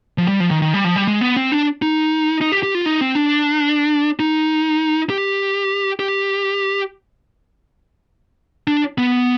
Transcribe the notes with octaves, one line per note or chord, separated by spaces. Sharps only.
F3
G3
F3
D#3
D#3
G3
F3
G3
G#3
B3
C4
D4
D#4
D#4
G4
G4
F4
D#4
C4
D4
D#4
G4
G4
D4
B3